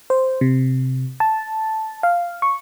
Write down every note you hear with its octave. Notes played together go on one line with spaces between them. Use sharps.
C5
C3
A5
F5
C#6